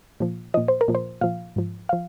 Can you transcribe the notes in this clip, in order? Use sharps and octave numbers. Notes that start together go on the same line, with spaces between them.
A#2 F3
A#2 F3 D#5
C5
A#4
A#2 F3
C5
A#2 F3 F5
G#2 F3
F3 F5